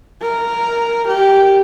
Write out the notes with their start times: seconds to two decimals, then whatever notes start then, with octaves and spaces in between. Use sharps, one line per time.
0.22 A#4
1.07 G4